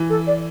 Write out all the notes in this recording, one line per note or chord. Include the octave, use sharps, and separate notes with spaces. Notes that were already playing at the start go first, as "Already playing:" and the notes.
Already playing: E3
A4
D5